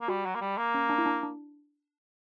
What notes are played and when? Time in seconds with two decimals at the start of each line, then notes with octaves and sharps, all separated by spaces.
0.01 A#3
0.08 G3 F#4
0.26 F#3
0.35 A#3
0.41 G3
0.57 A#3
0.74 C#4
0.89 D4
0.98 E4
1.06 D4
1.23 D4